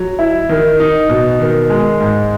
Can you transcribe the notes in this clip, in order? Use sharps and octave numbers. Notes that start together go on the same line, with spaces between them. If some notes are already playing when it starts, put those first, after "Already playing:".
Already playing: F#3
E4
D#3
D#4
B2
D#3
G#3
G#2